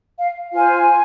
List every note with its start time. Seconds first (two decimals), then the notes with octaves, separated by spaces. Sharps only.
0.17 F5
0.53 F4 C5 G#5